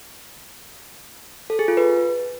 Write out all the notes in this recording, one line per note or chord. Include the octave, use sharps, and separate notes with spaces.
A4
G#4
F4
B4